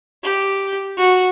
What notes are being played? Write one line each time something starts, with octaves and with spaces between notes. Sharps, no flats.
G4
F#4